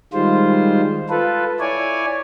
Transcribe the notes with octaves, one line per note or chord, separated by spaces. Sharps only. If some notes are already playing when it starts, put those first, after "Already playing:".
D#3 G3 G#3 F4 C5
F4 A4 B4
E4 C#5 D5 G#5